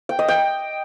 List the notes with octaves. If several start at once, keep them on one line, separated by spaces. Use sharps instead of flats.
G5
D#5
G5